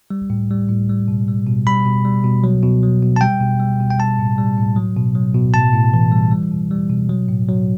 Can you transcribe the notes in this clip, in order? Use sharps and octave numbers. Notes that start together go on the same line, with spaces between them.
G3
A2
G3
A2
G3
B2
G3
B2
G3 B5
B2
G3
B2
F#3
B2
F#3
B2
A5
G3 G5
B2
G3
B2
G5
G3 A5
A2
G3
A2
F#3
B2
F#3
B2
A2 A5
A2
E3
G3
G3
B2
G3
B2
F#3
A2
F#3